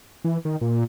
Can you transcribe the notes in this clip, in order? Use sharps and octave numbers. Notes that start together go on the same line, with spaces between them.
E3
D#3
A#2